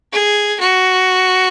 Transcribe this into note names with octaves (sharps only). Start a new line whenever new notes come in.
G#4
F#4